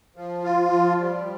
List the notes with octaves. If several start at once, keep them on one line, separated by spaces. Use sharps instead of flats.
F3
F4
F3
G3